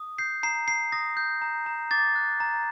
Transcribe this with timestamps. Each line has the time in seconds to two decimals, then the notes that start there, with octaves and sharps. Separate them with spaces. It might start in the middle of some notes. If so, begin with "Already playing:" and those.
Already playing: D#6
0.18 G6 C7
0.43 A#5 C7
0.68 A#5 C7
0.92 D#6 A#6
1.17 G6
1.42 A#5
1.66 A#5
1.91 D6 A6
2.16 F#6
2.40 A#5